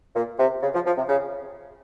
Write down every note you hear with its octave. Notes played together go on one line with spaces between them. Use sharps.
A#2
C3
C#3
F3
F3
C3
C#3